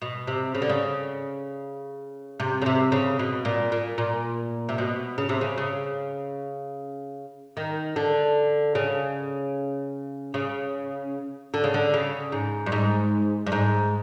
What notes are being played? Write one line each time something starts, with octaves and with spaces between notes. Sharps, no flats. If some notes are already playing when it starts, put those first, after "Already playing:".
B2
C3
C#3
D3
C#3
C3
C#3
C3
C#3
B2
A#2
A#2
A#2
C3
B2
C#3
C3
C#3
C#3
D#3
D3
C#3
C#3
D3
C#3
D3
C#3
G#2
G2
G#2
G2
G#2